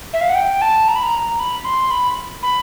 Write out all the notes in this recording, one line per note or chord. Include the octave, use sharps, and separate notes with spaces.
E5
F5
F#5
G5
A5
A#5
B5
A#5
B5
C6
B5
B5